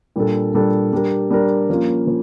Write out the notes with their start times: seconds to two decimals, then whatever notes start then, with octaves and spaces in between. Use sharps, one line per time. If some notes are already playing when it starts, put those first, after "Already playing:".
0.16 A#2 G3 D4 A4
0.53 A#2 G3 D4 A4
0.93 G3 D4 G4 A#4
1.31 G3 D4 G4 A#4
1.69 F3 A#3 C#4 F4
2.07 F3